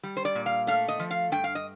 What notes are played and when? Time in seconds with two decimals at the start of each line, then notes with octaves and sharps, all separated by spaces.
0.03 G3
0.17 C5
0.25 D5
0.35 A#2
0.46 F5
0.67 A3 F5
0.88 D#5
1.00 F3
1.11 F5
1.32 G2 G5
1.44 F5
1.55 D#5